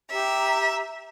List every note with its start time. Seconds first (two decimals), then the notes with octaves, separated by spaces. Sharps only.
0.11 G4 E5 A#5